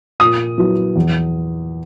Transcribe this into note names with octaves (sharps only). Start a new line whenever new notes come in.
A#2 D#6
F#3 B3 E4
E2